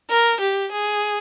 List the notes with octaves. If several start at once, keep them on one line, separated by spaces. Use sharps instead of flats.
A#4
G4
G#4